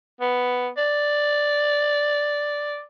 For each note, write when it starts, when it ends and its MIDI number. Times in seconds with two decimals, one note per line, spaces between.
0.20 0.68 59
0.77 2.82 74